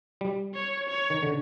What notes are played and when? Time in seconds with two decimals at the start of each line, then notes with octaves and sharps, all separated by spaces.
0.21 G3
0.54 C#5
0.89 C#5
1.10 D#3
1.23 D3